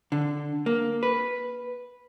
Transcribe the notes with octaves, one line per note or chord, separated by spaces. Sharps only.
D3
A#3
B4